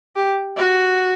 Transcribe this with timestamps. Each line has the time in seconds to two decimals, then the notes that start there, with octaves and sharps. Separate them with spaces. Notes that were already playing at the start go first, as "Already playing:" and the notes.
0.16 G4
0.57 F#4